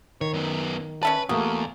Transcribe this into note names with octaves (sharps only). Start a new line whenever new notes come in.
D#3 C#5
F#2 B3
C#4 B4 E5 A5
E2 A3 A#3 F#4 G#4